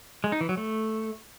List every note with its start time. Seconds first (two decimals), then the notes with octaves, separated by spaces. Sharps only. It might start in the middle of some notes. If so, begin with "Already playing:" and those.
0.24 G#3
0.32 D#4
0.41 E3
0.49 F#3
0.57 A3